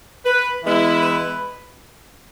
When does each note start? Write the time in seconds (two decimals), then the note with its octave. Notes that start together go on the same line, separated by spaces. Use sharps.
0.25 B4
0.63 E3 G#3 B3 E4
1.01 B4